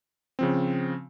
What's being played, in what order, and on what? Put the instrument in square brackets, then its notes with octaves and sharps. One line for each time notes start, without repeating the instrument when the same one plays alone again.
[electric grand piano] C#3 F3 C4